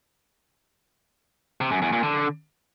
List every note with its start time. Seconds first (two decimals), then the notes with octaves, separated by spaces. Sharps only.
1.61 C3
1.71 F#2
1.82 E2
1.92 A#2
2.03 D3